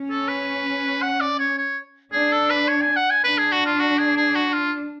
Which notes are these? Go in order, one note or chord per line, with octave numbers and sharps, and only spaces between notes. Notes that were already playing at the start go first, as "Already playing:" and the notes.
Already playing: C#4
A4
B4
F#5
D5
C#5
C#5
D4 G#4
A4
B4
C#5
G#5
F#5
G#5
D4 B4
G#4
F#4
F4
F#4
G#4
G#4
F#4
F4